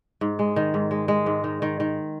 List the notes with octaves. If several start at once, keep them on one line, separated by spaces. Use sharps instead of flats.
G#2
G#3
D#3
G#2
G#3
G#3
G#2
D#3
D#3
D#3